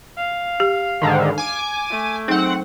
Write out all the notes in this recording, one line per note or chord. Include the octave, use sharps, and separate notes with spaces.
F5
G4
G#2 D3 D#3
G#5 D6
A3
F#3 C4 D#4 G#4 F#5